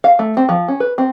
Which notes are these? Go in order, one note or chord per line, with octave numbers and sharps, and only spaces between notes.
F5
A3
C4
F3
C#4
B4
C4